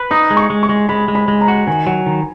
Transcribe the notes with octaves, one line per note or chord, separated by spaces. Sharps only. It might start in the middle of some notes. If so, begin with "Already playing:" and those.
Already playing: B4
D#4 D#6
G#3
C#6
G#3
C#6
G#3
G#3 B5
G#3
B5
G#3
A#5
F#4
D#3 G#5
F#3
D#3